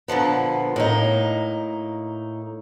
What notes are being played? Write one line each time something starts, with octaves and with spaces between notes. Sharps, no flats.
A#2 D3 F3 B3
A2 A#3 D#4